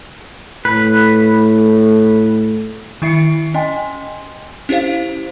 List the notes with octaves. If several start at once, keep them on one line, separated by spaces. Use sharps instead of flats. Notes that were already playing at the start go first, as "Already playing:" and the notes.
A2 B4
D#3 E4 E5 C7 C#7
C#4 D#5 G5 G#5 C6
C#4 E4 G4 C5 F5